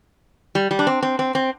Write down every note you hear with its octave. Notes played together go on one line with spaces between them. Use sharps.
G3
G3
D4
C4
C4
C4
C4